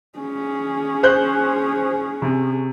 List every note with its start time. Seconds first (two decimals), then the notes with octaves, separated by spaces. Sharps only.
0.19 C#4 G#4
1.03 C5 F#6 G6
2.22 C3